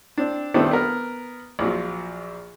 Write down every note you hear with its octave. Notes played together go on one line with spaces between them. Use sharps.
C4 D4
D#3 G3 A3 B3 C4 D4
B3 A#4
A#1 F3 F#3